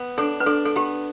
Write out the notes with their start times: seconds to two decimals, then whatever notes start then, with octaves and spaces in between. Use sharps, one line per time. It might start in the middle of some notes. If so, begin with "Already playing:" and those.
Already playing: B3
0.18 D4 A4
0.40 B4
0.46 D4 A4
0.66 A4
0.76 B3 G4